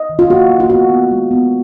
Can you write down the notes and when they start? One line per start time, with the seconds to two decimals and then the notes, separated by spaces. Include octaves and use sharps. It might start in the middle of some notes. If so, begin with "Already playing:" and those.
Already playing: D#5
0.09 D#3
0.19 F4
0.30 A#3 F#4
0.49 A#3
0.60 F4
0.70 B3 F#4
0.90 B3
1.11 G#3
1.31 B3